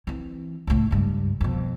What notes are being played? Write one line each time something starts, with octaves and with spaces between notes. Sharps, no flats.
E3 C4
C#2 A2
C#2 G2
F2 B2